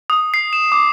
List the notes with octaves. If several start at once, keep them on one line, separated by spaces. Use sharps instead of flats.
D#6
C7
E7
D6